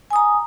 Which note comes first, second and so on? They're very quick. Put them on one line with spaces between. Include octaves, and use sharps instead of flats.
G#5 D#6 A#5